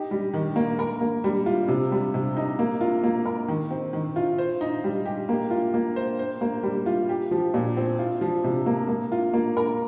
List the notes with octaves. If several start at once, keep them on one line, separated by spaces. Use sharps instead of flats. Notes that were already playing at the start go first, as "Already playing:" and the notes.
Already playing: D#4 G4
G3
D#3
A#3
A#4
A#3
G3
F4
C3
G3
C3
D#4
A#3
F4
A#3
A#4
D#3
C4
D#3
F4
C5
D#4
G3
G4
A#3
F4
A#3
C5
C5
A#3
G3
F4
G4
F3
A#2
C4
F4
F3
C3
A#3
A#3
F4
A#3
A#4